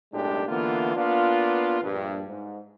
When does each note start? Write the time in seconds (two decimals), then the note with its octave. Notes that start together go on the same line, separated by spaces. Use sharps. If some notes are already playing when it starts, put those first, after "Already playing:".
0.13 B1 F#2 A2 G#3 D4 G4
0.48 D3 E3 A#3 B3 F4
0.95 A#3 B3 D4 F4
1.82 A#1 G2
2.27 G#2